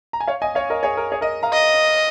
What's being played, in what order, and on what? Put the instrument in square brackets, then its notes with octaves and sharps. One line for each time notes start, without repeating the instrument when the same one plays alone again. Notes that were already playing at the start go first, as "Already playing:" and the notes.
[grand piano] A#5
G#5
C#5 F5
D#5 G#5
C#5 F5
A#4 D#5
G#4 C#5
A#4
G#4 C#5
A#4 D#5
F5 A#5
[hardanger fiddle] D#5